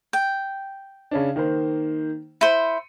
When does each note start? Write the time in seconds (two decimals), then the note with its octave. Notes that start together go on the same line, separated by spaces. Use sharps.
0.13 G5
1.11 C#3 C#4 D4
1.36 D#3 A#3 C5
2.41 E4 C5 C#7 D#7